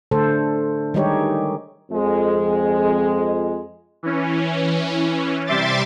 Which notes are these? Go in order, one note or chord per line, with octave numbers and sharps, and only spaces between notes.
D3 A3 A4 C5
D#3 G3 G#3 D#4 G4 C#5
F2 G#3
E3 C#4
C3 G3 E5 C6 D6 A6